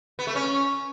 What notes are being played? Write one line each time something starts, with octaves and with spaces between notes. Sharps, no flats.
B3
A3
C#4